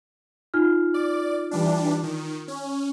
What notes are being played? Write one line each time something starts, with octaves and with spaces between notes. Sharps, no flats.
D#4 F4 F6
D5
E3 G3 D4
D#3
C#4